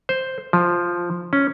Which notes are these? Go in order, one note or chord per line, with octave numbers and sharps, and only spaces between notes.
C5
F3
C#4